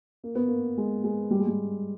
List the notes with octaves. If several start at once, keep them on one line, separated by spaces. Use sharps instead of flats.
A#3
B3
A#3
G#3
G#3
G3
G#3
G3